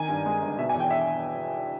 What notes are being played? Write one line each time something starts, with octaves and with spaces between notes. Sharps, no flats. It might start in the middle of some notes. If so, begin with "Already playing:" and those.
Already playing: D#3 G#5
G2
G#3
G1
B2 E5
G#5
E2
G5
E5